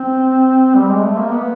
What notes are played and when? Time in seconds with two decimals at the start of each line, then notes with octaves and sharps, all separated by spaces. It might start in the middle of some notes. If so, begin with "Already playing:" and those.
Already playing: C4
0.75 G3
0.90 G#3
1.03 A3
1.17 A#3
1.31 B3